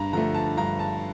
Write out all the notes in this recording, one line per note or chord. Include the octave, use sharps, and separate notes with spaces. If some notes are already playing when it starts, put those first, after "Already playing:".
Already playing: G2 A#5
D3 F3 A3 A#5
A5
G2 A#5
A5